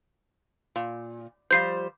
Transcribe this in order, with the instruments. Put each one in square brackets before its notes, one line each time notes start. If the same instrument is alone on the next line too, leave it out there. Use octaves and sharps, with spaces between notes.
[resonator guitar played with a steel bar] A#2
[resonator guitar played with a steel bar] F3 G3 C5 [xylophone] G6 C7